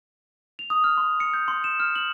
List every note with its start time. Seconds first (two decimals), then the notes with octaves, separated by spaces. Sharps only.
0.59 F7
0.70 D#6
0.84 F6
0.97 C6
1.20 C#7
1.34 G6
1.48 C6
1.64 E7
1.80 F6
1.96 F#7